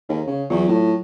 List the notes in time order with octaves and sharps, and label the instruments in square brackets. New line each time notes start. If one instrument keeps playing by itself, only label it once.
[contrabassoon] D#2 [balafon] G#4
[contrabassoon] C#3
[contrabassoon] E2 [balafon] F#3 E4 F4
[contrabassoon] A2